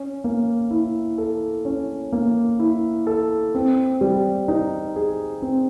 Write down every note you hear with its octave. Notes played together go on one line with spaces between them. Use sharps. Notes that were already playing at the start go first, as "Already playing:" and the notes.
Already playing: C#4
A#3
E4
A4
C#4
A#3
E4
A4
C4
G3
D#4
G#4
C4